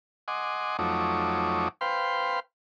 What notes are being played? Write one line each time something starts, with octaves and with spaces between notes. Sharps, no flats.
D#5 F#5 G#5 C6 D6
F2 F#3 A3 D#4 C#5 D6
B4 C5 F5 G5 C6